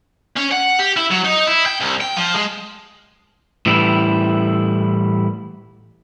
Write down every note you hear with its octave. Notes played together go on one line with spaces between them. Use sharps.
C#4
F#5
G4
E4
F#3
D#4
E4
G5
C2
G5
F3
G#3
A2 E3 G3 E4